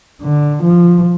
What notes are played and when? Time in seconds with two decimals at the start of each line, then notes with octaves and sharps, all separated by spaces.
0.22 D3
0.64 F3